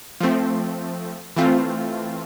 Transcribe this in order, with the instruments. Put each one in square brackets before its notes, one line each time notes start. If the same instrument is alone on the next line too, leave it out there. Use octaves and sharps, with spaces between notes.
[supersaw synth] F3 A3 C4
E3 A3 C4 F4